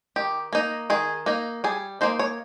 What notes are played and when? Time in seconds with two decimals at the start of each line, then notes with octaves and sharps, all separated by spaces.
0.16 D#3 G4
0.53 A#3 D#4
0.90 D#3 G#4
1.26 A#3 D#4
1.64 G3 G#4
2.01 A#3 D#4 C5
2.19 C#5